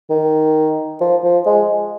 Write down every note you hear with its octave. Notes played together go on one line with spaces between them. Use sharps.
D#3
F3
F3
G#3